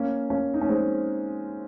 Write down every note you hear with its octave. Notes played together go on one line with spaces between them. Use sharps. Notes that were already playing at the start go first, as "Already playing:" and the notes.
Already playing: A#3 C#4
A#3 C#4
D#4
C#4
G#3 C4